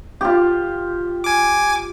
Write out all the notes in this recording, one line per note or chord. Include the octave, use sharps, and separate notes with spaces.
F4 G4
G#5 D6